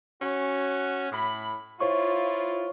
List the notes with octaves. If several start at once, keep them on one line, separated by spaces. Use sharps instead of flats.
C#4 F#4
A2 B5
E4 F4 C5 C#5 C#6